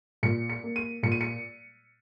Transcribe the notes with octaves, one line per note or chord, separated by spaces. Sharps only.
A#2 C#7
C#7
A#3
D#7
A#2 C#7
D#7
C#7